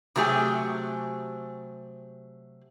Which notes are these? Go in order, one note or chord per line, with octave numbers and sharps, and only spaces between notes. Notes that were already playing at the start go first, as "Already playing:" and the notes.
C3 F#3 A3 G4 G#4 G#5